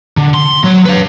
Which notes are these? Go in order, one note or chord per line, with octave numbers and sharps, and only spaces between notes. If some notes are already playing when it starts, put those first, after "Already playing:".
D3
C6
F#3 C#5
B4 F5